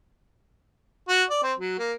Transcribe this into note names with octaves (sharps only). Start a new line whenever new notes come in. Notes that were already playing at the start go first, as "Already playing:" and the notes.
F#4
D5
C4
F#3
A#3